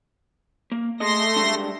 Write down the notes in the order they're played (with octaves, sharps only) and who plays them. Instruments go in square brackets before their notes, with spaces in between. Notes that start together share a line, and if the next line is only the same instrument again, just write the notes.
[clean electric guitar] A#3
[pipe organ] A3 C6 A#6 [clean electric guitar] G#4 A4 D#5
[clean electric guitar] G3 G#3 D4